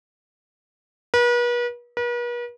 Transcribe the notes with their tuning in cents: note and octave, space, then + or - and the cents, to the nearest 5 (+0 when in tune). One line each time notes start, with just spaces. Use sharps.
B4 -40
B4 -45